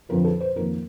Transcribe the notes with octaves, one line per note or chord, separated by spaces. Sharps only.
F2 D3 F3 A#4
A4
C5
F2 D#3 A#3 A#4